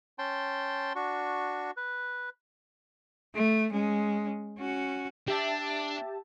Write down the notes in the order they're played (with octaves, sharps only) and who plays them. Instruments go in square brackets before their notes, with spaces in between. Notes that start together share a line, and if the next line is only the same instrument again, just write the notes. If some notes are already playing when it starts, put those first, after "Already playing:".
[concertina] C#4 G5 A5 C6
D4 F#4 C#6
B4
[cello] A3
G#3 C#4
C#4 F#4
[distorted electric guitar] D4 [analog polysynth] G4 E5 A5